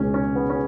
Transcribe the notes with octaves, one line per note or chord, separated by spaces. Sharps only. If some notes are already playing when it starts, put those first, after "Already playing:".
Already playing: C#2 B2 C#4
C#4
B3
C#4